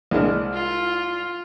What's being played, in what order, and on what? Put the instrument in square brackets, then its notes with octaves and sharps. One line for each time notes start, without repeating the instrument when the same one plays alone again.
[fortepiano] C2 G#3 D4
[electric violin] F4